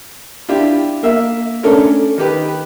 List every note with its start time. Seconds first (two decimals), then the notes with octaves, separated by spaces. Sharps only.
0.49 D4 E4 F4 G4
1.03 A#3 E5
1.63 A3 C#4 D4 A4 A#4 C#5
2.18 D#3 G4 B4